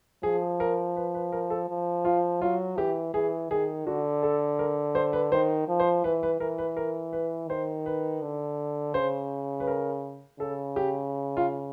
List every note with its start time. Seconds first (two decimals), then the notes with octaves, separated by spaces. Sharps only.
0.23 F3 G#4
0.60 A#4
0.96 B4
1.14 B4
1.32 A#4
1.50 A4
1.69 F3
2.05 F4
2.41 F#3 F4
2.78 E3 G4
3.14 E3 G#4
3.50 D#3 G#4
3.87 D3 F#4
4.23 A4
4.59 A#4
4.95 C5
5.13 B4
5.32 D#3 C5
5.68 F3
5.80 C5
6.04 E3 B4
6.23 B4
6.40 E3 A#4
6.58 B4
6.77 A#4
7.13 B4
7.49 D#3 C5
7.86 B4
8.22 D3
8.94 C#3 C5
9.60 B4
9.67 A#4
10.40 C#3 A4
10.76 G4
11.37 F4